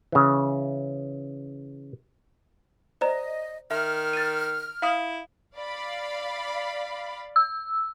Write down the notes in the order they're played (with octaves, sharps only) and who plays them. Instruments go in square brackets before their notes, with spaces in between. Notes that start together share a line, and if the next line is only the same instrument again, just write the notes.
[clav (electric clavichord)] C#3 E3
[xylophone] C5 D5 A#5 [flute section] D#5
[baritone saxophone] D#3 [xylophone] E5 [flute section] F6
[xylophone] A6 D#7
[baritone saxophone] E4 [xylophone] F5 D#6
[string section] D5 F5 B5
[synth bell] E6